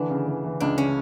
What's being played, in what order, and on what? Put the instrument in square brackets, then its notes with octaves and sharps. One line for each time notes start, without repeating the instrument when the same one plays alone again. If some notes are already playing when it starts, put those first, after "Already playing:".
Already playing: [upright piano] D3 E3 [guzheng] D4
[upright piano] C#3
E3
E3
[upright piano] C#2 [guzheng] D4
[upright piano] C#3 [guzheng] C#4